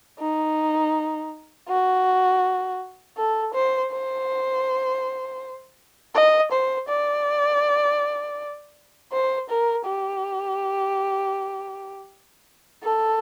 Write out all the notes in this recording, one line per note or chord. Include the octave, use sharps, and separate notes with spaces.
D#4
F#4
A4
C5
C5
D#5
C5
D5
C5
A#4
G4
A4